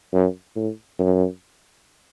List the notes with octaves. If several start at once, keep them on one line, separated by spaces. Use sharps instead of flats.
F#2
A2
F#2